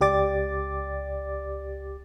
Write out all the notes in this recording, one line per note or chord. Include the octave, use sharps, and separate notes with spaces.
C#2 G4 D5 D6 A6